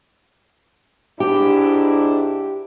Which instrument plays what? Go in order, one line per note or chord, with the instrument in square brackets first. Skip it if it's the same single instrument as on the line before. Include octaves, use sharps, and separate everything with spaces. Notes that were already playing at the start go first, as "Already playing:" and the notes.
[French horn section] G#2 D4 E4 [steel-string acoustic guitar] G4